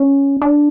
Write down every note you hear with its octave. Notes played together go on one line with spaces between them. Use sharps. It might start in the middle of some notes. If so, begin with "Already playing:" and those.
Already playing: C#4
D4